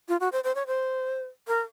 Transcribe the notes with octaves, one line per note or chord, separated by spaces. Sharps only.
F4
F#4
C5
C5
C#5
C5
A#4